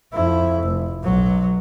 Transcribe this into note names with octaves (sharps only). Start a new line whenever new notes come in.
F2 E4
F1
B1 F#3